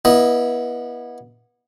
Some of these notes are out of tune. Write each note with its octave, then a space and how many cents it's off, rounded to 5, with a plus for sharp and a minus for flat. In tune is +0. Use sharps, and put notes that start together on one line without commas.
B3 -25 E4 +0 D#5 +0